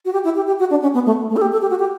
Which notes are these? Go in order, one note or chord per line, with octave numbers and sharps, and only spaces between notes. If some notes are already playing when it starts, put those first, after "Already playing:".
F#4
G4
E4
G4
G4
F#4
D4
C#4
B3
A3
A3
A4
G4
A4
G4
F#4
G4